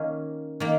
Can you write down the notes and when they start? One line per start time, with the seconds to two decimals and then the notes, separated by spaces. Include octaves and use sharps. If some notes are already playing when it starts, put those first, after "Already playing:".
Already playing: D#3 A#3 C#4
0.60 D#3 A#3